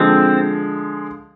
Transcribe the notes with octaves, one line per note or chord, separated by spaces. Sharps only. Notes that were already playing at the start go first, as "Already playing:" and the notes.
Already playing: D3 F3 G#3 C4